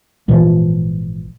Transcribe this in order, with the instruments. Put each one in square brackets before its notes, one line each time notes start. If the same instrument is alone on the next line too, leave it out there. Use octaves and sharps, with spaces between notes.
[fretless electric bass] G#1 A#2 E3 F3